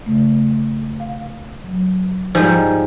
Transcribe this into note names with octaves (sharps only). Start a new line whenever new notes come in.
C#3 A3
F5
F#3
G#2 F3 G3